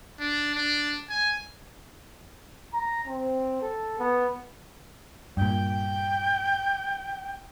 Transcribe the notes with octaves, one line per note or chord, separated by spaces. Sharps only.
D4
D4
G#5
A#5
C4
A4
B3
G2 A#2 G5